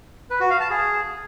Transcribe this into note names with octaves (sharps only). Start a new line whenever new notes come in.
B4
F#4
F5
A5
G#4